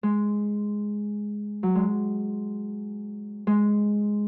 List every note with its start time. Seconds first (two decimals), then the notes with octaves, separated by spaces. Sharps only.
0.03 G#3
1.63 F#3
1.75 G#3
3.47 G#3